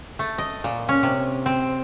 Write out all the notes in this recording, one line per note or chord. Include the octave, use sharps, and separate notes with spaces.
A3
D#5
A#2
C#4
C3
C4